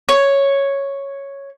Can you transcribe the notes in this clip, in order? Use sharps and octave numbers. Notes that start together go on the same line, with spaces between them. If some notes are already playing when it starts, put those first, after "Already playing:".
C#5